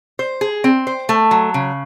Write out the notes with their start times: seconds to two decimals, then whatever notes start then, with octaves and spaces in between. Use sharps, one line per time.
0.19 C5
0.41 G#4
0.64 C4
0.87 C5
1.09 A3
1.31 F#3
1.54 C#3